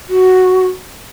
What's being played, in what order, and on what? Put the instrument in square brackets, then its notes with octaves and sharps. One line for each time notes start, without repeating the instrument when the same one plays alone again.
[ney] F#4